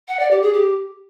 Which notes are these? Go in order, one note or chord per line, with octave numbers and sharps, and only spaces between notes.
F#5
D5
G4
G#4
G4